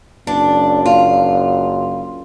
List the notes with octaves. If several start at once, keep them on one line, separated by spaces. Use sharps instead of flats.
F#1 D4
F4